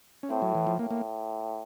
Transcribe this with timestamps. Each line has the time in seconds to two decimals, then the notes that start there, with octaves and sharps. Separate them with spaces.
0.23 C#4
0.30 A2 C4
0.42 F#3
0.55 E3
0.67 F3
0.79 A2 A#3
0.91 A#3